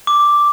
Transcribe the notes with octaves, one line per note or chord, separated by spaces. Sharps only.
D6